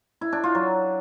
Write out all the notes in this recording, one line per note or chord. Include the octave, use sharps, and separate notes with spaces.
E4
D4
F4
F#3